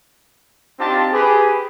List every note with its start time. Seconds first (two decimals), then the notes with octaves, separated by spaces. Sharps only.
0.79 C4 D4 D#4 F4 G4 A5
1.12 G4 G#4 B4